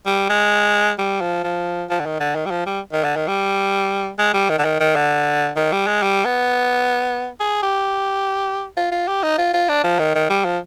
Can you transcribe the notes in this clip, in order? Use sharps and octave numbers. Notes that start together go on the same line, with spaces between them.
G3
G#3
G3
F3
F3
F3
D3
D#3
D3
D#3
G3
F3
G3
D#3
D3
D#3
G3
G#3
G3
D#3
D3
D#3
D#3
D3
D#3
G3
G#3
G3
B3
G#4
G4
F4
F4
G4
D#4
F4
F4
D4
F3
D#3
D#3
G3
F3